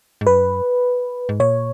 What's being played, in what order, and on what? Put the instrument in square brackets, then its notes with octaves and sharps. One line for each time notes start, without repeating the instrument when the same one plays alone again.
[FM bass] G#2
[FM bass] F#2 [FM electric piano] B4
[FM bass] G#2
[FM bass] A#2 [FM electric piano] C#5